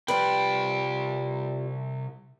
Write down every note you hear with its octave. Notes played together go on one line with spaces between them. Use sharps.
C2 F3 G3 C4 B4 G5